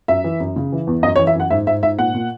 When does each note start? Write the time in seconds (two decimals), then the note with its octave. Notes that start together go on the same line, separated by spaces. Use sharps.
0.08 F#2 E5
0.24 E3
0.40 F#2
0.56 C#3
0.72 E3
0.87 E2
1.03 F#2 D#5
1.16 C#5
1.19 E3
1.27 E5
1.35 F#2 F#5
1.50 G#2 E5
1.67 G#2 E5
1.82 G#2 E5
1.98 A#2 F#5
2.14 A#2